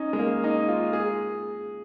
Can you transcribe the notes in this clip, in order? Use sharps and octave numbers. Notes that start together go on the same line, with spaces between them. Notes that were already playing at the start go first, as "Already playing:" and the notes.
Already playing: C#4 D#4
G#3
A#3
D#4
F4
G#4